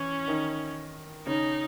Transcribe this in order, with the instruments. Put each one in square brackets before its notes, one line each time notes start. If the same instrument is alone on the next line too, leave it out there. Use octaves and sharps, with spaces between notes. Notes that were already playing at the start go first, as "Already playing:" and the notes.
Already playing: [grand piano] E3 E4 [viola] C#4
[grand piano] D#3 D#4
[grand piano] C#3 C#4 [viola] D#4